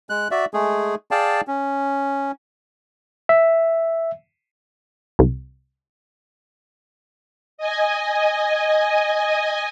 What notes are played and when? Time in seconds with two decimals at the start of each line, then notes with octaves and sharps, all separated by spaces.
0.10 G#3 F#6
0.31 F#4 D5 E5
0.54 G#3 A3 G#4
1.11 G#4 D5 F5 G5 A5
1.47 C#4
3.29 E5
5.19 C2
7.58 D#5 G#5